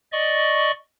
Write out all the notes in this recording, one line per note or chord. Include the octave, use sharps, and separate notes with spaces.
D5 D#5 C#6